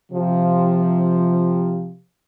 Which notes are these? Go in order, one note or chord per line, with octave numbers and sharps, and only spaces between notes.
C3 F3